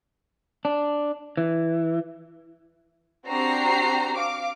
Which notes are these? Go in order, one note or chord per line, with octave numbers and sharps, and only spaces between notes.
D4
E3
C4 D4 F#4 G4 A#5 C7
F5 D6